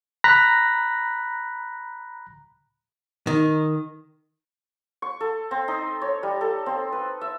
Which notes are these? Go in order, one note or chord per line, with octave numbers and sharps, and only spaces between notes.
A#5 B5 F#6 A#6 B6
D#3
C#6
A4
C4
D#4
C#5
G3
A4
C4
B4
E5